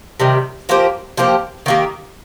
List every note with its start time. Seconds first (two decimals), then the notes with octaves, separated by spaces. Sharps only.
0.20 C3 D#3 G3
0.69 F3 A#3 G4 C5
1.17 F3 A#3 G4 C5
1.66 D#3 A#3 G4